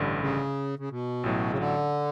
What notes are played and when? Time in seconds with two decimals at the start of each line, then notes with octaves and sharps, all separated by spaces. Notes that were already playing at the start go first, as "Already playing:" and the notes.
Already playing: A1 G2 D3
0.21 C#3
0.79 C#3
0.90 B2
1.24 A1 A2 F#3
1.50 C#3
1.58 D3